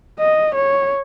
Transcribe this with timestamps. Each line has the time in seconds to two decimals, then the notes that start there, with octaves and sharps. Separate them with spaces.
0.19 D#5
0.54 C#5